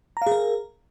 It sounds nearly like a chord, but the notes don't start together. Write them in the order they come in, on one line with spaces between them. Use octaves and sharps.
A#5 F5 G#4 A#4